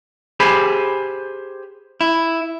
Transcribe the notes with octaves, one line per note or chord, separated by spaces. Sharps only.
G4 G#4 C5 G#5 B5
E4